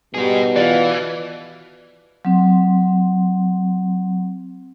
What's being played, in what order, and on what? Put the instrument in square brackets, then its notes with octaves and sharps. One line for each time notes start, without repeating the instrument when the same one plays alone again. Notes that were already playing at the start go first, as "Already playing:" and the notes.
[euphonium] B2 [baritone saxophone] G3 [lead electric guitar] D#4 G#4
[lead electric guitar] E3 [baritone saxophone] F4 [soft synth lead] D5
[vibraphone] F#3 C4